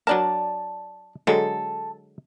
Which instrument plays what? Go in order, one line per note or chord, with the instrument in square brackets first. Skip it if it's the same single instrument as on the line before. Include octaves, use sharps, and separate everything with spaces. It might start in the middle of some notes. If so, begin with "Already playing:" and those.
[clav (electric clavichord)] F#3 D4 A#4 [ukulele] D5 A5
[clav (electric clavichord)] D3 F#3 G#3 [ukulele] A4